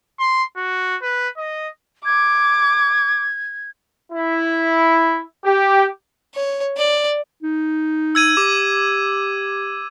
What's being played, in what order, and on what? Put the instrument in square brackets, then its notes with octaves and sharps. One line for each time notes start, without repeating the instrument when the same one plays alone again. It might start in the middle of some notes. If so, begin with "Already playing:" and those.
[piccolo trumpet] C6
F#4
B4
D#5
[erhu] D6 [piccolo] G#6
[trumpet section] E4
G4
[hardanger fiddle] C#5
D5
[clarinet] D#4
[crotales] E6 G#6 D#7
[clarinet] G4 [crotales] D6